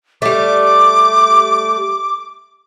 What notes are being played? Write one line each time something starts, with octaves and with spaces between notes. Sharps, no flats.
G3 A3 D6